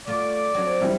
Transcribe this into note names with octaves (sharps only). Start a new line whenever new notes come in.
A3 F4 D5 D6
F#3 C4 D4
G3 E4